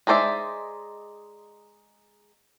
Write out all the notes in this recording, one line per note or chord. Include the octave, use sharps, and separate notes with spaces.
G#3 D#4 C5 D5 E5